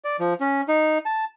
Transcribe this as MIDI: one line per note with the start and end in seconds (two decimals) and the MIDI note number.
0.04 0.17 74
0.19 0.34 53
0.40 0.61 61
0.68 0.98 63
1.05 1.25 81